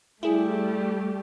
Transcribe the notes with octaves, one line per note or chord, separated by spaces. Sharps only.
G3 A3 E4 G4 G#4